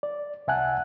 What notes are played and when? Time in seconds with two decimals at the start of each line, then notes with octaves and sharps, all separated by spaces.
0.03 D5
0.48 C2 E5 F#5 G#5 A5 F#6